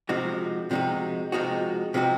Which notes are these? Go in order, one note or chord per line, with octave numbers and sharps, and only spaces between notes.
C3 F3 G#3 D#4 F#4
C3 F3 G#3 D#4 F#4
C3 F3 G#3 D#4 F#4
C3 F3 G#3 D#4 F#4